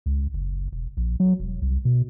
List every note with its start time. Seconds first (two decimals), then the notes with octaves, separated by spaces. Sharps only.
0.06 C#2
0.34 F#1
0.72 E1
0.97 A#1
1.20 F#3
1.40 E1
1.62 C2
1.85 B2